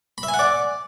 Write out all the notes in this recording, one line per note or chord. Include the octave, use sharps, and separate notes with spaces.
B5
E5
G#5
F#5
D5